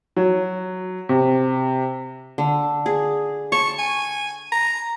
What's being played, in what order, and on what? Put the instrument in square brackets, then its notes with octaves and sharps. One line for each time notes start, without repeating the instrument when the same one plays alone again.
[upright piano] F#3
C3
[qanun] D3
G#4
[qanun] A5 [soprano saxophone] C#6
[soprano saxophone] G#5
A#5